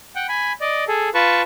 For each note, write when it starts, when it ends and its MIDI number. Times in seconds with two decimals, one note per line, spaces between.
0.16 0.27 78
0.16 0.27 79
0.29 0.53 80
0.29 0.53 83
0.61 0.84 74
0.61 0.84 75
0.88 1.09 68
0.88 1.09 69
1.14 1.42 65
1.14 1.42 71
1.14 1.42 81
1.14 1.42 85